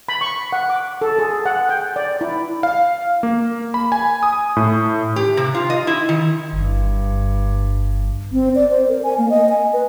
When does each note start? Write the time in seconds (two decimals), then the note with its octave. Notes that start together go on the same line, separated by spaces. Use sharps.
0.09 B5
0.21 C#6
0.53 F#5
0.70 D6
1.01 A4
1.19 G#4
1.46 F#5
1.69 G5
1.96 D5
2.21 E4
2.63 F5
3.23 A#3
3.74 B5
3.92 G#5
4.23 D#6
4.56 A2
5.16 G4
5.37 C3
5.55 F4
5.70 D#5
5.87 E4
6.09 D#3
6.53 G1 G2
8.33 C4
8.55 D5
8.71 C5
8.88 A#4
9.04 G#5
9.18 A#3
9.30 D#5
9.49 G#5
9.73 B4